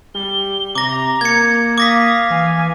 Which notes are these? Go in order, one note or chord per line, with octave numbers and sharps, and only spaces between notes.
G3 G7
C3 A#5 D6 A#6
A#3 G#6 C#7
F5 D6 D#6 A#6 B6
E3 G#5